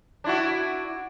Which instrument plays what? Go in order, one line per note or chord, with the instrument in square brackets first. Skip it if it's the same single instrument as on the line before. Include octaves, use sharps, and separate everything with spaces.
[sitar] D4 E4 F#4